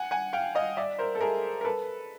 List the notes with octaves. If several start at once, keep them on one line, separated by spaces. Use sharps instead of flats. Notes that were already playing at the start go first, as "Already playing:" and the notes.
Already playing: F#5 G#5
F#5 G#5
F5 G5
D#5 F5
D5 E5
A#4 C5
A4
G#4 A#4
A#4
A4 B4